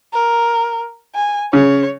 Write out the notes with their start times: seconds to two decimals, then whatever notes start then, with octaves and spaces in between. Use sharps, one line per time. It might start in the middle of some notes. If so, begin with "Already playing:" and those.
0.13 A#4
1.15 G#5
1.53 C#3 C#5